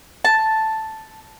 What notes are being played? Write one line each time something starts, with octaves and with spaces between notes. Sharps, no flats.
A5